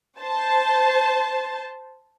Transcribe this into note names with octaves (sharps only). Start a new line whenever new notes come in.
C5 A5